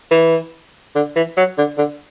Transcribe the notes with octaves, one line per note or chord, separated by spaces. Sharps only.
E3
D3
E3
F#3
D3
D3